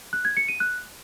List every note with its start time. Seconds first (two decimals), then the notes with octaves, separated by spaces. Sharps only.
0.13 F#6
0.25 G#6
0.37 C#7
0.48 D#7
0.60 F#6